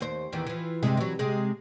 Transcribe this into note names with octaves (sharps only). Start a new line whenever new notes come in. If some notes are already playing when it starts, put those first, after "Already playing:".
D#2 C5
E2 D#3 E3
E3 F3
G2 C3 G#3
E3 F#3
C3 G#3